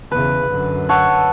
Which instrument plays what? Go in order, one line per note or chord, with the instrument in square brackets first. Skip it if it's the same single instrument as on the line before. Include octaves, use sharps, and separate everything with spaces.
[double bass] E2 C#3 [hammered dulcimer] B4
[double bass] F#2 D3
[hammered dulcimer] A4 C#5 F#5